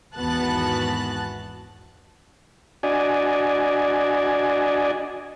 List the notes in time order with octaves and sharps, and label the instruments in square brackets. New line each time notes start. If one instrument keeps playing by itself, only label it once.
[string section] G#1 E2 B3 F#4 A5 F#6
[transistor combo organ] D4 F#4 D5 D#5 G#5